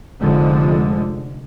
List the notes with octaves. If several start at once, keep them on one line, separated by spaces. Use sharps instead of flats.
F1 D3 F3 G#3